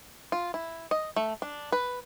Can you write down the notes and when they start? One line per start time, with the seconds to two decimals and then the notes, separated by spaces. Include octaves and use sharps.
0.32 F4
0.54 E4
0.91 D#5
1.16 A3
1.42 D4
1.72 B4